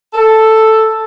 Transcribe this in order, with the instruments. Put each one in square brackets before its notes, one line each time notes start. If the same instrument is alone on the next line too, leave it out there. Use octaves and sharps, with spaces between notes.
[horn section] A4